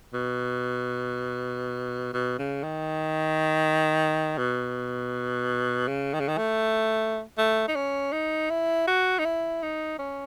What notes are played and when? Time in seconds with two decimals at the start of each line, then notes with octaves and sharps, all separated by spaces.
0.14 B2
2.14 B2
2.39 C#3
2.63 D#3
4.38 B2
5.88 C#3
6.13 D#3
6.20 C#3
6.28 D#3
6.38 A3
7.38 A3
7.68 D#4
7.75 C#4
8.12 D#4
8.50 E4
8.88 F#4
9.19 D#4
9.25 E4
9.63 D#4
9.99 C#4